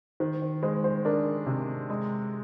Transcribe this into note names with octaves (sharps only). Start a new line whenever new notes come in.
D#3 C5
C5
G#3 C5
C5
D4 A#4
C3
G#3